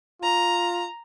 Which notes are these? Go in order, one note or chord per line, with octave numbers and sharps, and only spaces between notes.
F4 A#5